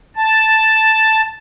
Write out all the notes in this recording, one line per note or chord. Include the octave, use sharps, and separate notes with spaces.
A5